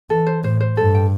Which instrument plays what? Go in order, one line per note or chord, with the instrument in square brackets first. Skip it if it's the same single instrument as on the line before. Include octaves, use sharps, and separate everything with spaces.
[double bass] E3 [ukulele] A4
[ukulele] C5
[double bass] A2 [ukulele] C5
[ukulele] C5
[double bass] G2 [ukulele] A4
[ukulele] G5